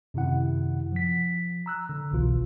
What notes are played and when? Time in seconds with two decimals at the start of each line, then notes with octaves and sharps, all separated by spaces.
0.14 F#2 C3 D#3 E4 F#5
0.92 F3 B6
1.66 A#5 E6 F#6
1.89 D3
2.11 G1 C2 B2 E3 F4